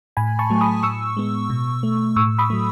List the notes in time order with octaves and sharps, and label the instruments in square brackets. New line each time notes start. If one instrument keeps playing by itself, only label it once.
[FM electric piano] A2 G#5 B5
A5 C#6
F#3 A3
B5 D#6
A2 C#6 E6
G#3 B3
B2
A3
A2 C#6 E6
B5 D#6
F#3 A3